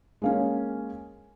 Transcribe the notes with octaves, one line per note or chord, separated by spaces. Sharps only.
G#3 A#3 C#4